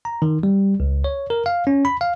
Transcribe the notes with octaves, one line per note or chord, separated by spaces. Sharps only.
A#5
D#3
G3
C#2
C#5
A#4
F5
C#4
B5
F5